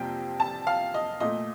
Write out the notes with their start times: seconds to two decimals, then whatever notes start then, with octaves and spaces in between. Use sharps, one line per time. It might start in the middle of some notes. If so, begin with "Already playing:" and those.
Already playing: F2 C3 G3 A#3 G5
0.40 A5
0.67 F5
0.94 D#5
1.20 A#2 A3 D#5